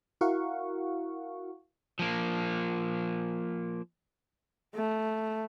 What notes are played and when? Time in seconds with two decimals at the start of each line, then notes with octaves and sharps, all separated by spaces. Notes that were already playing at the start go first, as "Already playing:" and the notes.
0.21 E4 F#4 A#4 F5 F#5 C#6
1.99 F3 A#3
4.74 A3